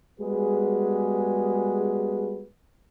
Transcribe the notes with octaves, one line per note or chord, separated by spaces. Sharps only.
G3 G#3 B3 F#4 G#4 B4